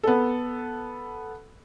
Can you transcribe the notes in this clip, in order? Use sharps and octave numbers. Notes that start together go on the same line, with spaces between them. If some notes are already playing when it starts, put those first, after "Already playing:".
B3 A4